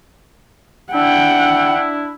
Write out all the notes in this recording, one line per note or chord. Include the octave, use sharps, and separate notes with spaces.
D4 E4 F#5 G5